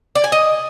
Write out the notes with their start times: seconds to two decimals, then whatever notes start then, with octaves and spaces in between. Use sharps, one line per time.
0.15 D5
0.24 G#5
0.32 D#5